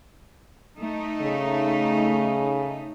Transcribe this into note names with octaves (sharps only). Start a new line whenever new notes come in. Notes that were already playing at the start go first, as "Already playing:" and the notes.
A3 D#4
C#3